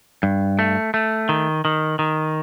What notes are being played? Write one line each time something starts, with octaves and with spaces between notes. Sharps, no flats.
G2
A3
A3
D#3
D#3
D#3